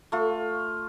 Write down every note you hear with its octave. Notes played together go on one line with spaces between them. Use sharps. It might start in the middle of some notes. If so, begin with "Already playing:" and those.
A3 F4